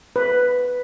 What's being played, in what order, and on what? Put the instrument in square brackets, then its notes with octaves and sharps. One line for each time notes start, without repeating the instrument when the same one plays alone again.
[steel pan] B4